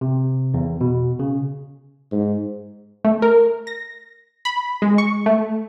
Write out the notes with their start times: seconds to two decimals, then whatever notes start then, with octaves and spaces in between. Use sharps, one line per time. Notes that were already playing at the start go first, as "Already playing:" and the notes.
0.01 C3
0.54 E2
0.81 B2
1.19 C#3
2.12 G#2
3.05 A3
3.22 A#4
3.67 A#6
4.45 B5
4.82 G#3
4.98 C#6
5.26 A3